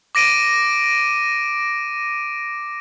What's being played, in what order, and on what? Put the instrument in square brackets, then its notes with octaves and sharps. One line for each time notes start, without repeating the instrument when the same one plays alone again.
[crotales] D6 A#6 D7 D#7